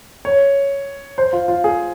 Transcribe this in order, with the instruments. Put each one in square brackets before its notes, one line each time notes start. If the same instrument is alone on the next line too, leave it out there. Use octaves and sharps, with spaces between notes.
[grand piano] C#5
C5
F4
F4
G#4